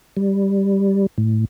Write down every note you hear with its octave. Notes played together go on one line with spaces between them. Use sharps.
G3
A2